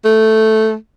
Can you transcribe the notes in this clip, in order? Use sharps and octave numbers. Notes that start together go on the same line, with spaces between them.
A3